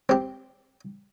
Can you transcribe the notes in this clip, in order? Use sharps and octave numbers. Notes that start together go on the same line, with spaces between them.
C4 G4